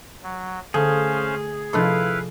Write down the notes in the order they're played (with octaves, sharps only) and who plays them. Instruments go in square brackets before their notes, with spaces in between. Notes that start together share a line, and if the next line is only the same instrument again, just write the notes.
[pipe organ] F#3
[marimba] D3 [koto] A3 [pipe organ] C#4 C5 F5 [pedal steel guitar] G#4
[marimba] C3 F3 [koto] D4 F4 A4 [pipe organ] E4 B4 F5